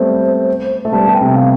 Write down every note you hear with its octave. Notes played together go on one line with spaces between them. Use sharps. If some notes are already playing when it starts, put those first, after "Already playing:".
Already playing: G3 A3 B3 C4 C5
A3
G3 B3 A5
G3 B3
G5
C3
F5